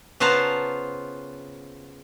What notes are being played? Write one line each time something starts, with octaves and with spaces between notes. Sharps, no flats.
C#3 B3 F4 C5 A5 A#5